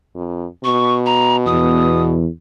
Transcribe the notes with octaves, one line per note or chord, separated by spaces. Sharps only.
F2
B2 C#6
A#5
E2 D#6